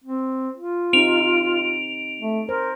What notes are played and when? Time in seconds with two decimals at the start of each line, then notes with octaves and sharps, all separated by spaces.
0.04 C4
0.57 F4
0.93 C4 D#4 G4 D7 F7
2.19 A3
2.49 A#4 C5